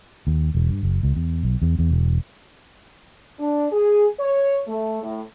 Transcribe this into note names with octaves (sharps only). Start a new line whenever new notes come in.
D#2
E1
G2
F#1
C#2
E2
B1
E2
E2
E1
D4
G#4
C#5
A3
A2